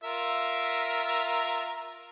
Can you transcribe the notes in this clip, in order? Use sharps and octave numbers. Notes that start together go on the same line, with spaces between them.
F4 A#4 E5